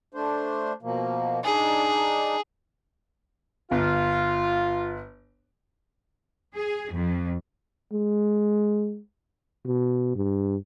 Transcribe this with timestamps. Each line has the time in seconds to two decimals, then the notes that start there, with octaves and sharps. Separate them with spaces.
0.14 A3 D4 C5
0.83 B2 F3 A#3
1.44 D4 D#4 G#4
3.71 G1 F4
6.55 G#4
6.93 F2
7.93 G#3
9.66 B2
10.16 G2